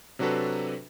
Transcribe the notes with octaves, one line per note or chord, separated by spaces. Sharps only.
C3 F#3 D4 F#4 A4 B4